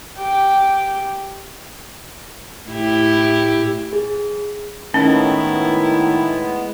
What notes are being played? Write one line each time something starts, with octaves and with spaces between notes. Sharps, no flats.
G4
A2 E4 G4
G#4
A2 D#3 G#3 B3 C#4 E4